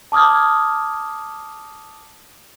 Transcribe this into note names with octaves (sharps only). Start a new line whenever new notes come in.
A5 D6 D#6 F6 G#6